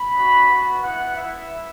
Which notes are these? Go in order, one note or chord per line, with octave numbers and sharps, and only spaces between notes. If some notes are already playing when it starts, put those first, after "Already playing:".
Already playing: B5
B3 D4 F#4
B3 F#4
B3 E4 F#5
B3 E4 E5